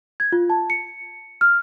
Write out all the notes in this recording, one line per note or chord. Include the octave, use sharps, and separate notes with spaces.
G#6
F4
A5
C#7
F6